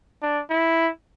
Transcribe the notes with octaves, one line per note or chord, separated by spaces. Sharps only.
D4
E4